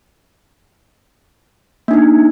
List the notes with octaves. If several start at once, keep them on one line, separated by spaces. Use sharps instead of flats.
A#3 D4 D#4